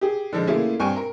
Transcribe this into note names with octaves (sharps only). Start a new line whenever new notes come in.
G4 G#4
D3 F3 G#3
A3 A#3 C#4 E4 F4 G#4
G2 C4 G5 G#5 C#6
A#4